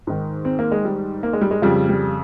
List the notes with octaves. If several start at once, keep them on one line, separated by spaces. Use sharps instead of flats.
G#2 D#3
C4
A#3
G#3
G3
A#3
G#3
G3
G#3
F2 C#3 G3
G3